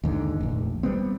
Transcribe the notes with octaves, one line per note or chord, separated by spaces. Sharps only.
D#2 G#2 D3
F1 A#1
G3 B3 C4